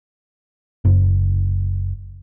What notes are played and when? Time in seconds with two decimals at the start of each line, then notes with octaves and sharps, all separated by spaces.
0.85 F#1